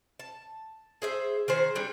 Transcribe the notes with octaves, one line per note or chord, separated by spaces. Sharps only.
A5
G#4 C5 E5
D#3 G#4 C5
G3 D4 G#4